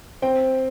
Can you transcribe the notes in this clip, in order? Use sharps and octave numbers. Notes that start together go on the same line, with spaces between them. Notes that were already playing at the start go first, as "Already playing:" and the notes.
C4 G5